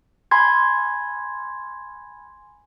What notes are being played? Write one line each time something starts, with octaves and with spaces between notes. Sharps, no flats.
G#5 B5 C6 G#6